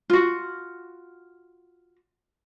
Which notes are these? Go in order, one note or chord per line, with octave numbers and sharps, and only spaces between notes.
F4 F#4